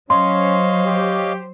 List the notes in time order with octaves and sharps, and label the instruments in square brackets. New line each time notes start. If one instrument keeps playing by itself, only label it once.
[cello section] F#3 C5 [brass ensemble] C#4 [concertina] C#5 D#5 F5 [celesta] C6
[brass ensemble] G4